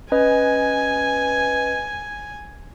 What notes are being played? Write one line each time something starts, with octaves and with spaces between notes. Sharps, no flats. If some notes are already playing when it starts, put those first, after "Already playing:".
C#4 B4 D#5 G#5